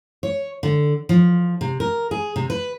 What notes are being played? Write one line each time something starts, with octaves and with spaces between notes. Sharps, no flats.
C#5
D3
F3
C3
A#4
G#4
C3
B4